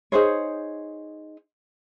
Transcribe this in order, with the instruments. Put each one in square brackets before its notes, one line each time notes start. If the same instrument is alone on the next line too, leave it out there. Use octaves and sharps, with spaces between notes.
[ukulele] D#4 G#4 C5 C#5